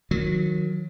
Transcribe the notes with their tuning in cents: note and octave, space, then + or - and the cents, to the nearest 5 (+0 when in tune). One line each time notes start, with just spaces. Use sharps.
D#3 +0 F#3 -25